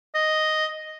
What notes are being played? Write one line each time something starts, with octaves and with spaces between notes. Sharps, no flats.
D#5